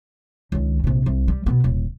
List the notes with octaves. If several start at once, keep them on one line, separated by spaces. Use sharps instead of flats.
C#2 D#3
A#1 C3
C2
G3
B2 B3
D#1